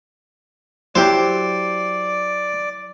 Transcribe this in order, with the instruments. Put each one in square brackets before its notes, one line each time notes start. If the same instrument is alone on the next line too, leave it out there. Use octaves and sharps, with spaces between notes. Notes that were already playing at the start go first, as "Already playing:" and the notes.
[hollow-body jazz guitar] F#3 [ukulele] E4 G4 [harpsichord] C5 [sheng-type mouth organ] D5